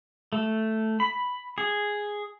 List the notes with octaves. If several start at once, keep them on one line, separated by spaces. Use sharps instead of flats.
A3
B5
G#4